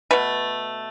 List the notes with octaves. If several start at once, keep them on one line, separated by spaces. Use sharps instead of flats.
B2 A3 B4